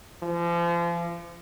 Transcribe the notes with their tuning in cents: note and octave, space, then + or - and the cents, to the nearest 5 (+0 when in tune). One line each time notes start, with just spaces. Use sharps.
F3 -35